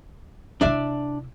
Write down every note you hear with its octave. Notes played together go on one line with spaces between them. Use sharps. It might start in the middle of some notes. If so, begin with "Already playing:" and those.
C3 D4 E4 D5 E5